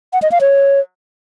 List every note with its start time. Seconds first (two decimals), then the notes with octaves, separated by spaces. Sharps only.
0.13 F#5
0.22 D#5
0.32 F5
0.41 C#5